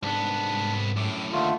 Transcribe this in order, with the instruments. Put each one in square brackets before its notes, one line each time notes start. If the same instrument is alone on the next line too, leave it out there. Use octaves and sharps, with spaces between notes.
[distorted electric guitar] C2 B3 [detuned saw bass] G#2 [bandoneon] D4
[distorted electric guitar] F#2 A2 [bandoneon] D6
[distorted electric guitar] D#2 [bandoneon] D3 A3 F4